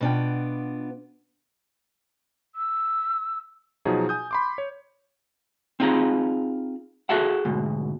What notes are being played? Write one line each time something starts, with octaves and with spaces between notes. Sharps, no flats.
B2 B3 D4 F4 G5
E6
B2 F3 F#3 D#4 G#4
G#5 D#6 G6
B5 C6 D6
C#5
C4 D#4 F4 G#4 A#5
F#4 G#4 A4 E5 F#5
D2 G#2 B2